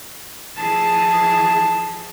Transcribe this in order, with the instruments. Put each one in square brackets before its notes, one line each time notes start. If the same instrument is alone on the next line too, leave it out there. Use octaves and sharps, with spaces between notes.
[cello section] E3 F3 G#4 [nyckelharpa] A5